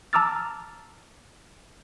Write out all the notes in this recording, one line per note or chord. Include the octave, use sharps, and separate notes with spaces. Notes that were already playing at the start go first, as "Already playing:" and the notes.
A5 A#5 D6 E6 F6 A6